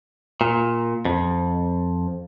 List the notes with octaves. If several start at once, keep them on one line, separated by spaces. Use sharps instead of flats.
A#2
F2